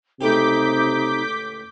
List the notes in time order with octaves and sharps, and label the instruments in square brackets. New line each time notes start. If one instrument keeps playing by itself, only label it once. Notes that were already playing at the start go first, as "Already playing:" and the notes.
[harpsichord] C#2 A2 G4 [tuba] C3 [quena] D#4 [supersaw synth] D6 G6 B6